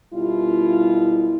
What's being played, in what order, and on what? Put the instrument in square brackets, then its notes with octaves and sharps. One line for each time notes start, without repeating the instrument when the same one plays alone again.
[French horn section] F#2 B2 G3 E4 F4